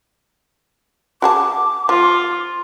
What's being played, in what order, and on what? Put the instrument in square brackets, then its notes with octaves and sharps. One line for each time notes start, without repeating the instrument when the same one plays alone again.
[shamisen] F#4 G#4 A5 [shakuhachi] D6
[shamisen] F3 [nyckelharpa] F4